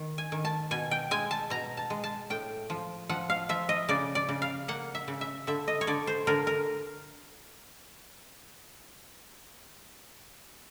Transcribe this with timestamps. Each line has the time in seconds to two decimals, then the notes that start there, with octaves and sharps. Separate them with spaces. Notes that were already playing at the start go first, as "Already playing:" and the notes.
Already playing: D#3
0.18 G#5
0.32 D#3
0.45 A5
0.71 B2 G#5
0.91 G5
1.11 G#3 G#5
1.31 A5
1.50 B2 A#5
1.77 A5
1.90 G#3
2.04 A5
2.30 A2 G5
2.70 F3
3.09 F3 F#5
3.30 F5
3.49 F3 E5
3.69 D#5
3.89 C#3 D5
4.15 D5
4.29 C#3
4.42 F5
4.68 A#3 F#5
4.95 E5
5.08 C#3
5.21 E5
5.47 D3 E5
5.68 D#5
5.81 C#5
5.87 D3 D5
6.07 C5
6.27 D3 A#4
6.47 A#4